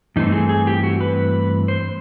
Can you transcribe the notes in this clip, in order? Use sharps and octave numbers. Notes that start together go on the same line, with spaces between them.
G2 E3 A3 C4 D#4
G#4
G#4
G4
F#4
B4
C5